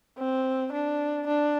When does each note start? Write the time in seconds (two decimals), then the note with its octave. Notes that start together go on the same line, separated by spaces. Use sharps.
0.18 C4
0.73 D4
1.27 D4